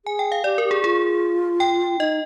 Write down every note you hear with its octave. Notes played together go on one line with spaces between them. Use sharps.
G#4 G#5
G5
F5
G4 D5
A#4
G4
G#4
F4 G#4
G5
D#4 D#5